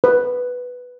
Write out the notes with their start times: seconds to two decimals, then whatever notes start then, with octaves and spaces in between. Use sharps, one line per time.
0.04 B4